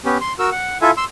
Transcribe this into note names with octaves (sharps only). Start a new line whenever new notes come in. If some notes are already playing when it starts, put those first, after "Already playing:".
B3 C#4 G4
C6
F#4 A#4 E6
F#5
E4 F4 A4 E5 G#5
C6 E6